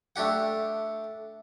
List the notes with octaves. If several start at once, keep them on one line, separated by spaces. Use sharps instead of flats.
A3 D4 G4 F#5